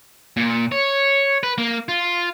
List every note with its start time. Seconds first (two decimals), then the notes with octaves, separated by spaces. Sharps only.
0.37 A#2
0.72 C#5
1.43 B4
1.58 A#3
1.89 F4